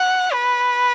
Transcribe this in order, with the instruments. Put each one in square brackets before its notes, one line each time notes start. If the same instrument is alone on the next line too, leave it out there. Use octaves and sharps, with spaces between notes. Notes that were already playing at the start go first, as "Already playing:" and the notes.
Already playing: [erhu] F#5
B4